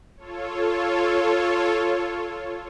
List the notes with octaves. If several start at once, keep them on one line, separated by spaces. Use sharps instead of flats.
F4 A4 C#5